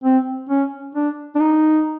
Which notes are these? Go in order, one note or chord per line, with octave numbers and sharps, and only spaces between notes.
C4
C#4
D4
D4
D#4